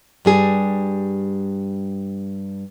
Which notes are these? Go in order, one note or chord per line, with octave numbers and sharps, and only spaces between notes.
G2 G3 G#4